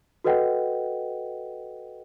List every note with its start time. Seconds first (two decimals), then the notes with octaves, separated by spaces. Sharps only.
0.24 F#4 A4 B4 D#5 F#5 G5